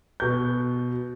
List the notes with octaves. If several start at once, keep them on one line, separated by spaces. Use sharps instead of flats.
B2 G6